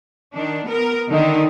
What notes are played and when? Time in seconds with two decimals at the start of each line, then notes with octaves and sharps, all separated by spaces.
0.35 D#3 D4
0.65 B3 A#4
1.09 D3 D#3 D#4